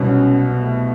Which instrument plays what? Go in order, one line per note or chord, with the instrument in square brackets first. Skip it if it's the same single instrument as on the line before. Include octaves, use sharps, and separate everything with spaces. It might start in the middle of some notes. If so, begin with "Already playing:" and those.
Already playing: [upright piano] C2 B2 F#3 [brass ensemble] B3 C#4
[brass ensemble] A3 B3